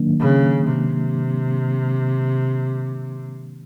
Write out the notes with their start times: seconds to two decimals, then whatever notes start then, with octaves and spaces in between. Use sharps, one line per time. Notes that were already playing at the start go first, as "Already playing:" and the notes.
Already playing: D#3 F#3 A#3 D4
0.20 C#3
0.67 C3